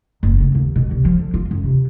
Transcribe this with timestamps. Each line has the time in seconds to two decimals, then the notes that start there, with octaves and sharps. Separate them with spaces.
0.23 F#1
0.40 C#3
0.55 D#2
0.76 B2
0.91 C2
1.05 F3
1.19 D3
1.34 F4
1.51 F#2
1.64 C3